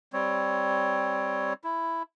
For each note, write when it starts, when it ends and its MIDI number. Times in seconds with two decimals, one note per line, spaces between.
0.13 1.53 55
0.13 1.53 60
0.13 1.53 73
1.64 2.03 64